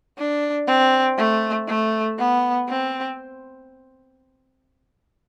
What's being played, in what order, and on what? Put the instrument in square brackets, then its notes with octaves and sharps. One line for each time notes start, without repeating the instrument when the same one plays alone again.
[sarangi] D4
C4
A3
A3
B3
C4